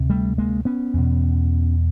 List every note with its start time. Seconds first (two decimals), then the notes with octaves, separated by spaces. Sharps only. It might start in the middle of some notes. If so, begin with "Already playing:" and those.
Already playing: D2 C3
0.10 G3 A3
0.38 G#3 A#3
0.65 B3 C#4
0.94 E2 B2